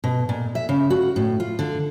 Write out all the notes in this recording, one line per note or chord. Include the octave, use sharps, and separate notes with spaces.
B2
A#2
E5
C#3
F#4
A2
F4
D3